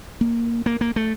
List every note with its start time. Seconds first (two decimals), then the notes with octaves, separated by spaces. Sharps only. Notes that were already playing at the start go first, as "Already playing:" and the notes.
0.21 A#3
0.66 A#3
0.81 A#3
0.96 A3